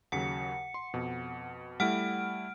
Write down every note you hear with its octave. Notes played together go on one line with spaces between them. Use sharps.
D#2 C#3 F#3 F#5 C#7
C6
F2 B2
G3 A3 E4 F#5 F6 D7